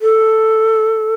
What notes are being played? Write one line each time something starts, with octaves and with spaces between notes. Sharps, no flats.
A4